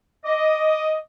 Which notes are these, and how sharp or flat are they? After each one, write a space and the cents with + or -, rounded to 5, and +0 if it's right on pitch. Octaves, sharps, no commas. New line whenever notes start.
D#5 +0 D6 +0